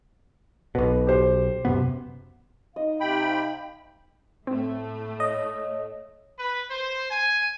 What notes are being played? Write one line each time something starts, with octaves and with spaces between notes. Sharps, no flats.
B1 B2 B4
G4 C5
F#2 C3 B3
D#4 D#5 F5
C3 G5 B5
A2 A3 C4
C#5 D#5
B4
C5
G#5